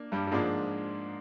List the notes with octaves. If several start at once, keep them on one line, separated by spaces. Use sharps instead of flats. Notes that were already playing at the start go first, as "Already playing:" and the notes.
Already playing: A#3 D4
G2 G3
G3
G#2 F3 G#3 A#3 D4